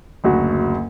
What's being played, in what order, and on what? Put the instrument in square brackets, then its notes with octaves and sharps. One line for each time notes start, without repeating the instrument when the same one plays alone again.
[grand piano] F#1 D2 F#4